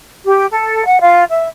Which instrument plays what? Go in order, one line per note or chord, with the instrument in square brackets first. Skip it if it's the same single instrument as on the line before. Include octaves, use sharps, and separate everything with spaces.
[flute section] G4
A4
F#5
F4
E5